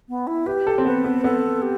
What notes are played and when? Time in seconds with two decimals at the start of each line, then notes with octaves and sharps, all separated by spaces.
0.09 B3
0.27 E4
0.46 G4 B4
0.67 A4
0.78 C4
0.85 B3 B4
1.05 B3
1.24 B3 A4
1.62 G4